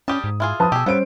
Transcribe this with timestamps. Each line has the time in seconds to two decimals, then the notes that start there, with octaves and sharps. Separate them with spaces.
0.08 G3 C#4 G4 A5 D#6
0.24 G#2
0.40 E4 F4 G#4
0.60 F3 B4 A5 D#6
0.72 B2 G4 G#4 E6
0.86 G3 B3 C#4 C5 D7